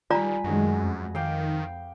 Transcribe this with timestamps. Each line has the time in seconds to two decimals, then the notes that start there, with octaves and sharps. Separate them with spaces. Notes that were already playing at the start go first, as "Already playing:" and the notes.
0.10 D#3 G3 F4 B4 D5 G#5 A#5 B5
0.44 F#2 D#3 G#3 A3 F#4 G#4
0.81 F2
1.15 D#3 F5 G5 D6